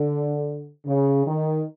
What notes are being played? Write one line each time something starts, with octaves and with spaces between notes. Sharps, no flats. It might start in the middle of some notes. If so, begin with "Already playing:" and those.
Already playing: D3
C#3
D#3